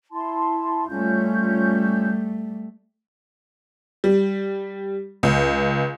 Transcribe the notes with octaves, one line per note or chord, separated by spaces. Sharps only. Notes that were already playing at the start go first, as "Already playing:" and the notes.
E4 A5 C6
G3 A3 C#4 F4 G6
G3
C#2